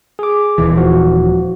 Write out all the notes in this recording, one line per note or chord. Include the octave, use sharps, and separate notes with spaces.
G#4 D6
D#1 E3
F3 F#4